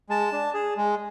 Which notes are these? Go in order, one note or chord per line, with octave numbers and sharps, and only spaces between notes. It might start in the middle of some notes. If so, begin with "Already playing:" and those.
G#3 A5
D4
G#4
G#3